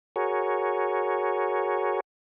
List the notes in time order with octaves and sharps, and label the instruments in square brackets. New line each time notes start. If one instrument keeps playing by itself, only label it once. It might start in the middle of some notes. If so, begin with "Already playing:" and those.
[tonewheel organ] F#4 G#4 A#4 C#5